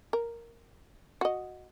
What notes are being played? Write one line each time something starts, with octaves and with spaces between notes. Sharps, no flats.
A#4
F#4 D#5